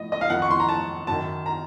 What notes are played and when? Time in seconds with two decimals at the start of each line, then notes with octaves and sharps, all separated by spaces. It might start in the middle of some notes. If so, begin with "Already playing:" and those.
Already playing: A2 F3 D#5
0.12 D#5
0.21 F5
0.30 F2 D#3 F#5
0.42 C#6
0.51 C6
0.60 A#5
0.69 A5
1.07 F#2 D#3 A5
1.46 A#5